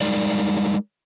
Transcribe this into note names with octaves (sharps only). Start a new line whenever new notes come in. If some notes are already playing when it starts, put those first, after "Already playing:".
G3 G#3 D#4 A#4 D5